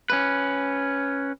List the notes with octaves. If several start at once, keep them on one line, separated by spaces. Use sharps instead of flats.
C#4 B4